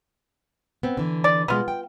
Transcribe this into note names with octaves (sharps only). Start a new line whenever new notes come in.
B3 C4
D3 E3
D5
B2 G#3 B3 F4
G5